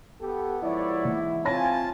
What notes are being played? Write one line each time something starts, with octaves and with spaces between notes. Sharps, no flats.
B3 G4 A4
G#2 F3 E4 C#5 D5
E3
C4 F4 C#5 G#5 A5 B5 A#6